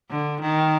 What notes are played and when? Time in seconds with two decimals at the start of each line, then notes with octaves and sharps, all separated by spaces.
0.10 D3
0.42 D#3